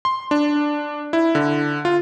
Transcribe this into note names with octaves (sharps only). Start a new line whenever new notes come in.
C6
D4
E4
D3
F4